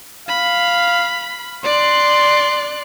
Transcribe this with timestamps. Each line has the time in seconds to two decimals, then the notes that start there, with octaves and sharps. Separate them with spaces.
0.29 F5 B5
1.64 D5 C6 F#6